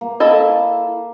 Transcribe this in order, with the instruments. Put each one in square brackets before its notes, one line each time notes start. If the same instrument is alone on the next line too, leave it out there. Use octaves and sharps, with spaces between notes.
[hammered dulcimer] A#3
[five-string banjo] E4 A4 D#5